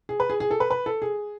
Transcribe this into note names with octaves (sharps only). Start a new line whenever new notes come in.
G#4
B4
G#4
G#4
A4
B4
B4
A4
G#4